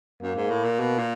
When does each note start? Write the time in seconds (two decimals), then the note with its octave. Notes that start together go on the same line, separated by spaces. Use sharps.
0.21 F#2 A#3
0.36 G#2
0.51 A2
0.65 A#2
0.79 B2
0.99 A#2